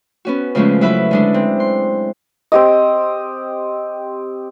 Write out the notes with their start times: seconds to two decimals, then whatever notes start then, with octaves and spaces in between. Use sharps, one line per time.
0.25 B3 C#4 F#4
0.55 C#3 F3 G#3 A3 C#4
0.81 F#3 E4 B4 E5
1.11 D3 G#3 D4
1.34 C4
1.60 C6
2.52 C4 G4 D#5